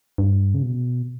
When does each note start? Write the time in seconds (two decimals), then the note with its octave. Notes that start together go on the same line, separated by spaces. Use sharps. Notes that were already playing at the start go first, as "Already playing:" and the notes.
0.18 G2
0.54 C#3
0.63 B2